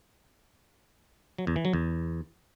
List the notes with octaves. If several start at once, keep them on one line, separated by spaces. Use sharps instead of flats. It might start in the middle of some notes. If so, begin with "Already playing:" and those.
F#3
E2
E3
F#3
E2